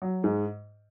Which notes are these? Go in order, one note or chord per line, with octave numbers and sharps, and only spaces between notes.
F#3
G#2 G#3